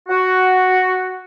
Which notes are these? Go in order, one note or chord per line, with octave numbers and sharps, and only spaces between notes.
F#4